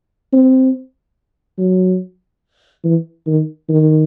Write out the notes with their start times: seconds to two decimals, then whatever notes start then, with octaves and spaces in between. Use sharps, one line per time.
0.33 C4
1.58 F#3
2.84 E3
3.27 D#3
3.69 D#3